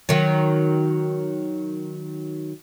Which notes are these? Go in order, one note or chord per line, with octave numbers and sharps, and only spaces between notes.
D#3 F#3